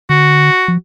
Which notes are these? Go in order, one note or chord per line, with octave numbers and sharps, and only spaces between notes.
D3 F#4
F3